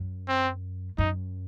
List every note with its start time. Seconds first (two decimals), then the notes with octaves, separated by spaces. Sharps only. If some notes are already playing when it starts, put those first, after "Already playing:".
Already playing: F#2
0.28 C4
0.98 F#2 D#4